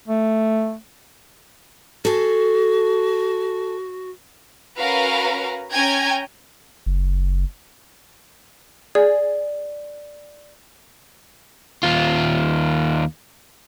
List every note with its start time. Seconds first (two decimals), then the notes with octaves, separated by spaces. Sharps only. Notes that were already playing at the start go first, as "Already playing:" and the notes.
0.08 A3
2.05 F#4 G#4 A4
4.76 C#4 F#4 A#4 B4 F5 A#5
5.73 C#4 G5 G#5 A#5 G#6
6.86 F#1
8.95 G#4 D5
11.83 D#2 F4